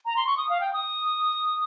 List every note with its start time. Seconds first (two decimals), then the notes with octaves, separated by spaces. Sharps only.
0.06 A#5
0.16 C6
0.27 C#6
0.37 D#6
0.49 F5
0.61 G5
0.73 D#6